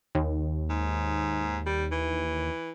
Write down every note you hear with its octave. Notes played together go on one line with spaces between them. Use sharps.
D#2
G#2
G3
E3